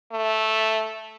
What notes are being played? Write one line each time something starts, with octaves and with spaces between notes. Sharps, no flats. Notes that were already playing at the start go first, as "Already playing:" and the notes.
A3